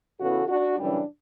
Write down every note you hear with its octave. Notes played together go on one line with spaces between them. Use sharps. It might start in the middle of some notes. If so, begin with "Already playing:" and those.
E2 C#3 E3 B3 F#4 A4
D4 F#4
F#2 C#3 E3 G3 D4